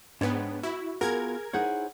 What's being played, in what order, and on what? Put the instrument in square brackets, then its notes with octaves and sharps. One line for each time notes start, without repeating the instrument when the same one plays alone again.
[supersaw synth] G#2 B3 [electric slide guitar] D4 C#5 G5
[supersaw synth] E4 [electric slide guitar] F#4
[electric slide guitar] B3 F4 F#4 [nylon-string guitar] G#4 [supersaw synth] A#4 G#6
[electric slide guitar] D#4 C5 C#5 [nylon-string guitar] E4 G#4 F#5